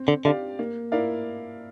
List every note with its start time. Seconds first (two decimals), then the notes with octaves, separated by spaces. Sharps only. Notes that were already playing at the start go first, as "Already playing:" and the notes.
Already playing: C4
0.08 D3
0.25 D3 G4 D5 F5
0.59 A#3
0.92 E4 A#4 D5 F5